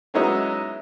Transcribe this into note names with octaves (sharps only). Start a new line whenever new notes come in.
F#3 G#3 B3 C#4 D#4 E4